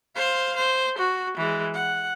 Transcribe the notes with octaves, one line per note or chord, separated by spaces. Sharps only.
C5 F5
C5
F#4
E3 G#3
F#5